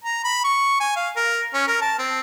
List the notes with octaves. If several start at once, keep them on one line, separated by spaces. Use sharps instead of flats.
A#5
B5
C#6
G#5
F5
A#4
C#4
A#4
A5
C4